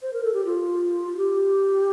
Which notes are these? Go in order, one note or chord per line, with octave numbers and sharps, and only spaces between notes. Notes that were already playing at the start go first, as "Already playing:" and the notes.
C5
A#4
A4
G4
F4
G4